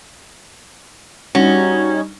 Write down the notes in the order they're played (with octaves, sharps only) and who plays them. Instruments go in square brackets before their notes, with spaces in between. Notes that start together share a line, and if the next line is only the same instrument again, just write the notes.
[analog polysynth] G3 D#4 [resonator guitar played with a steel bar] C#4 [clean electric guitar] F#4